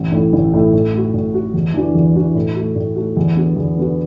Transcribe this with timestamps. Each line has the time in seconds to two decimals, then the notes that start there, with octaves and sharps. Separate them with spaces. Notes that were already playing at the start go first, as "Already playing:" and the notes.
Already playing: A1
0.12 A2 A3 E4
0.33 A1
0.53 A2 A3 E4
0.73 A2
0.94 A3 F#4
1.14 A2
1.34 A3 F#4
1.54 E2
1.74 E3 D4 F#4
1.95 E2
2.16 E3 D4 F#4
2.35 A2
2.56 A3 F#4
2.76 A2
2.96 A3 F#4
3.17 E2
3.36 D3 B3 F#4
3.56 E2
3.77 D3 B3 F#4